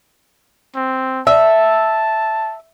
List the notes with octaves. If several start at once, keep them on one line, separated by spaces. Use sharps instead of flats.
C4
E5 A5